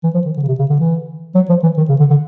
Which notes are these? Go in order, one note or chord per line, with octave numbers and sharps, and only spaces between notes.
E3
F3
D#3
D3
C#3
C3
C#3
D3
E3
F#3
F3
E3
D#3
C#3
D3
D3